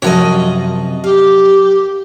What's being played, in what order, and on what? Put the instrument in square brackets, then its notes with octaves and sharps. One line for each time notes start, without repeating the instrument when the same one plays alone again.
[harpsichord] F#2 F#4 C#5 [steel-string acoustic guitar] C3 F3 D#5
[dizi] G4 [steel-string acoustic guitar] F5